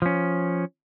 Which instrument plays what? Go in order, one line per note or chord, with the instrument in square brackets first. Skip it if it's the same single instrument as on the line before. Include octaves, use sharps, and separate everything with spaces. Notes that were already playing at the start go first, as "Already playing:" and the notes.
[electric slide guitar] F3 C#4